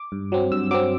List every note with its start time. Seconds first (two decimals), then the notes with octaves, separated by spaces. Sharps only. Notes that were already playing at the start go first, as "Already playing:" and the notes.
Already playing: D6
0.12 G2
0.32 F#3 C4
0.51 G2 E6
0.71 F#3 C4 D6